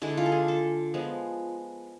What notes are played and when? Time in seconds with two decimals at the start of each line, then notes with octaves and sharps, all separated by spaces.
0.02 D3 G#3 D4 E4
0.17 F4
0.26 A4
0.32 G#4
0.48 A4
0.94 F3 G#3 B3